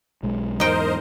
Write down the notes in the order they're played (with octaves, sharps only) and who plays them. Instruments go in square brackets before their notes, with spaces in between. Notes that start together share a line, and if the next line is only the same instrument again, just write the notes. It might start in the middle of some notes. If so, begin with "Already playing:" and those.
[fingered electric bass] B1 G#3
[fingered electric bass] E2 G#2 [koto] D#4 G5 [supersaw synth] A#4 C5 D#5